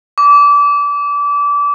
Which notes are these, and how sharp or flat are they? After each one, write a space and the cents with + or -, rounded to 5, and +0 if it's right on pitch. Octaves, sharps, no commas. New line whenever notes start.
D6 -25